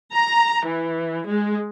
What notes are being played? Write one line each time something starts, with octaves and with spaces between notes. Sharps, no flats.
A#5
E3
G#3